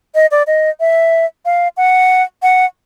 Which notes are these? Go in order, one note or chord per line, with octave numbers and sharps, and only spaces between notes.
D#5
D5
D#5
E5
F5
F#5
F#5